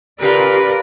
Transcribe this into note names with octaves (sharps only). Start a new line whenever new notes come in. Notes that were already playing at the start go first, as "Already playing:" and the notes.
A#2 C#3 F4 G4 A#4 B4 D5